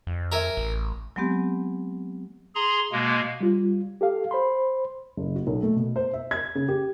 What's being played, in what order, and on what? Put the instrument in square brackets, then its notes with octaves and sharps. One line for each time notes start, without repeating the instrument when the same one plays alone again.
[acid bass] F2
[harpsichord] A#4 E5 G#5
[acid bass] A1
[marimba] F#3 G#3 B3 C4 G4
[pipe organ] G#4 A#5 C6
B2 G#3 A#3
[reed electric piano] G3 F4
G4 A4 F5
C5 B5 C6
[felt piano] F#1
F#4
B1
A3
B2
C5
E5
G#6
C#3
G4